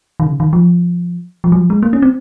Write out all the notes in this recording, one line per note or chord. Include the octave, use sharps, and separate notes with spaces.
D#3
C#3
D#3
F3
F3
F#3
F3
G#3
A#3
C#4
C4